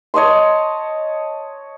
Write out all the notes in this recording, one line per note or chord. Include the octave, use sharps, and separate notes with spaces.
C#5 D#5 A5 C6